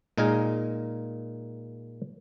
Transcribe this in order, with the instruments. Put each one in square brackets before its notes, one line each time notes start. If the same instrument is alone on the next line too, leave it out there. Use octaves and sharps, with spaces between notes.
[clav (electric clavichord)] A#2 G#3 D#4 G#4 A#4 G#5